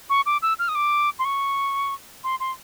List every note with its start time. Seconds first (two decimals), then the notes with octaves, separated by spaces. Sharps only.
0.10 C#6
0.26 D6
0.42 E6
0.59 F6
0.68 D#6
0.75 D6
1.19 C6
1.25 C#6
2.24 C6
2.40 C6